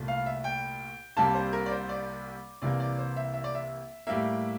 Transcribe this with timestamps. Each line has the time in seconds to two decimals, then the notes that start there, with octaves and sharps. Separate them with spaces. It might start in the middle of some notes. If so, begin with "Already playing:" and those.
Already playing: C2 A#2 A3
0.08 F5
0.26 E5
0.44 G5
1.16 C2 C3 G3 A#3 A5
1.34 C5
1.53 A#4
1.66 D5
1.71 C5
1.89 D5
2.62 C2 C3 E3 A#3 D5
2.80 D5
2.98 C5
3.16 E5
3.34 E5
3.44 D5
3.55 E5
4.07 A2 G3 A#3 E5